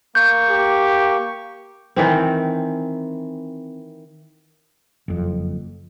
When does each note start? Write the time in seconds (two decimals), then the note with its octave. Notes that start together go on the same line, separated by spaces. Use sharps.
0.15 A#3 C#6 G6
0.49 G4
1.96 D#3 E3 C4
5.08 F#1 F2